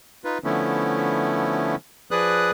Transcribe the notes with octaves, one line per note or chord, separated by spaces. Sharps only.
D#4 F4 B4
D3 F3 A3 B3 C#4 E4
F3 G#4 B4 D5 D#6 F#6